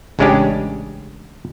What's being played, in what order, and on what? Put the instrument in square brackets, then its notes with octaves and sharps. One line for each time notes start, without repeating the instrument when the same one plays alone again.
[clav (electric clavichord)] A1 C#3 G#3 C#4 D4 G4